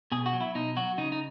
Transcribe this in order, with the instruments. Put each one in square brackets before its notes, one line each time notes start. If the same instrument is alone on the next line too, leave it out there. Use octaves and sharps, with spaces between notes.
[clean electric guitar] B2 G#4
F#4
F#3
E4
B2 D#4
F#3 F#4
C#3 D#4
D#4